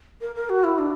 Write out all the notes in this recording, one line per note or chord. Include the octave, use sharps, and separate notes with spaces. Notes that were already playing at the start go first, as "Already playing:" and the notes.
A#4
A#4
F#4
E4
D4